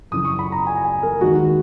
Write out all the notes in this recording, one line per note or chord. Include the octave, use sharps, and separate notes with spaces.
F#2 C#3 E3 D#6
C#6
B5
A#5
G#5
G#5
A#4
D#2 D#3 G#3 F#4